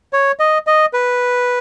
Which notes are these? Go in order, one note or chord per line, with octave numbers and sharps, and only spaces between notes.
C#5
D#5
D#5
B4